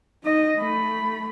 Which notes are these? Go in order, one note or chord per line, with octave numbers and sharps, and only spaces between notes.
D#4 D#5
A3 B5